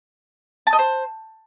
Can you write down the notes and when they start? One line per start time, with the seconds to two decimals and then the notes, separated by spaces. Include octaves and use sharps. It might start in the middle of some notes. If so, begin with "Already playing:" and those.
0.67 A5
0.73 D#5
0.79 C5